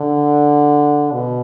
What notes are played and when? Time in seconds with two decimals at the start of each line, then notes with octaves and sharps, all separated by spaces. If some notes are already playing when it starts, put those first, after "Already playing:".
Already playing: D3
1.12 B2